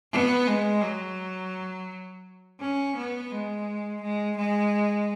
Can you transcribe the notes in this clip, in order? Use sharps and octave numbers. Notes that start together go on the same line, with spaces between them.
B3
G#3
F#3
C#4
B3
G#3
G#3
G#3